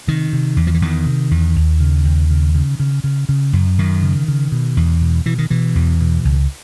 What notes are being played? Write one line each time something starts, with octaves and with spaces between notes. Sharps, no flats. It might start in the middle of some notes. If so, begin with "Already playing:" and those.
C3 D#3
C3
E2
F3
E3
E2 D#3
C3
E2
D#2
C#3
D#2
C#3
C#3
C#3
C#3
C#3
F#2
F#2 D#3
C#3
C#3
B2
E2
B2
B2 E3
D#3
B2 E3
E2
B2
C#2